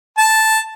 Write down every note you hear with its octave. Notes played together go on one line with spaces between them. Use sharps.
A5